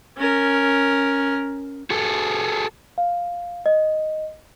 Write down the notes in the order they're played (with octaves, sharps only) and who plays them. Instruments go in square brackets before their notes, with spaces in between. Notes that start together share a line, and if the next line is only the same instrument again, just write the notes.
[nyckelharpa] C#4 A#4
[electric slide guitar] F#4 G#4 A4
[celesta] F5
D#5